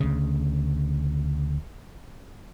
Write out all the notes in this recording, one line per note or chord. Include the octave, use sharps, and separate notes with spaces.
D2 C#3